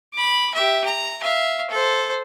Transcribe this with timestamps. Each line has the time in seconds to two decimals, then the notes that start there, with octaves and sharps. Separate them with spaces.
0.13 B5 D6
0.54 G4 E5
0.85 A#5
1.21 E5 F5
1.70 A4 C5